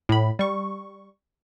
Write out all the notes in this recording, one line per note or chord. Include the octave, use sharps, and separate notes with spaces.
A2 B5
G3 C#6